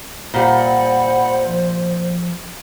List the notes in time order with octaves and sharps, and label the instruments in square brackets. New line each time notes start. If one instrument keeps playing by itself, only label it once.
[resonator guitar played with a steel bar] A#2 G3 [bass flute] C5 [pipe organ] F#5 B5
[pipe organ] F3